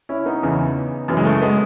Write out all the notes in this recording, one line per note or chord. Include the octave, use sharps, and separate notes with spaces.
C#4 E4
B3 D#4
E2 C#3 E3
F#2 C#3 E3
G#3
A3
G#3 B3